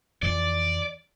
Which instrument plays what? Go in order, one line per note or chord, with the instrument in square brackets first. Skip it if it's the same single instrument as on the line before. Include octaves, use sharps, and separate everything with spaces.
[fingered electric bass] F2 E3 [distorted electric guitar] D5